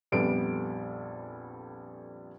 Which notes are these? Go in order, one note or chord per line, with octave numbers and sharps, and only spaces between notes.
A#1 F2 G3 B3 A4 D7